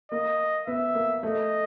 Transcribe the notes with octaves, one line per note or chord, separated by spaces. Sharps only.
A#3 D#5
B3 E5
A#3
A3 D#5